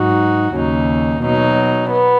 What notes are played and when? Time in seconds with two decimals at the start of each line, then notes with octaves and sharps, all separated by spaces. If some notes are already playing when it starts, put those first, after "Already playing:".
Already playing: G#2 F#3 D#4 F#4
0.52 D#2 C#3 F#3 D#4
1.21 B2 F#3 D#4
1.89 B3